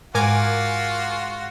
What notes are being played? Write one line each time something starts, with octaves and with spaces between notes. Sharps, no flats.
G#2 F4 F#4 A#4 G#5 D6